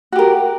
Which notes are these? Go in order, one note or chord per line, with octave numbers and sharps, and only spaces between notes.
F#4 G4 A#4